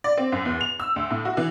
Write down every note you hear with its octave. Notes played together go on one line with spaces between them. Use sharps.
D5
C4
F#2
E2
F7
E6
D2
A2
F#4
E3